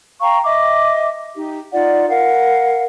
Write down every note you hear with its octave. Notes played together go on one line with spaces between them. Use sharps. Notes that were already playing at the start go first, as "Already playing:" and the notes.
F5 G5 A#5 C#6
D#5 E5 D6
D#4 G4
D#4 F4 D5 F#5
A#4 F5 F#5